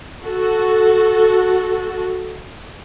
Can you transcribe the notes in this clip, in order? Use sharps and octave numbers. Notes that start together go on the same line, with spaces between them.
F#4 A4